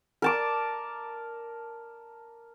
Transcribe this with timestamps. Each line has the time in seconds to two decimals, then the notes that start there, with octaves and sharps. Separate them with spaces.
0.22 A#4 A5 D6